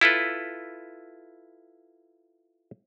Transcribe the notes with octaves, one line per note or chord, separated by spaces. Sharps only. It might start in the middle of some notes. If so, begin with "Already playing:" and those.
E4 F4 A4 B4